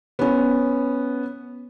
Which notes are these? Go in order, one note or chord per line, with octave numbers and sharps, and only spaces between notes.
B3 C#4